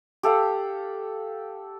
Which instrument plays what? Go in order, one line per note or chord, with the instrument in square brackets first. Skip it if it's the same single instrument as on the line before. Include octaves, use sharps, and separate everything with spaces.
[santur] G4 A4 F5 F#5